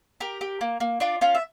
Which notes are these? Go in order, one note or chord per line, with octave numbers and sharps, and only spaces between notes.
G4 A#4
G4
A#3
A#3
D4 F4 D5
C#4 F4 F5
E5